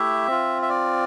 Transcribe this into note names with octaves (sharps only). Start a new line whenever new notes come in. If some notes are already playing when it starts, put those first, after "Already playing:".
Already playing: A3 E4 G4 E5
C4 F4
E5
D5